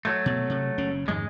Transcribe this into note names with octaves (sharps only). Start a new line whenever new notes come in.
F#3 A3
B2
C3
F#1 C#3 C#4
F2 G#2 D#3 G#3